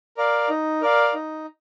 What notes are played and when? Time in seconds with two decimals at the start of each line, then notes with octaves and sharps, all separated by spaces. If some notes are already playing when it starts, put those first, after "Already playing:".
0.17 A#4 D5 F5
0.49 D#4
0.82 A#4 D5 F5
1.14 D#4